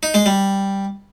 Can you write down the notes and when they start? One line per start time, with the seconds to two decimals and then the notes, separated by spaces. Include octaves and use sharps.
0.03 D#4
0.14 G#3
0.26 G3